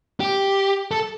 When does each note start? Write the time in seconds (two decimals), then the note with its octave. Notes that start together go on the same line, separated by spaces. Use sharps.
0.20 G4
0.91 A4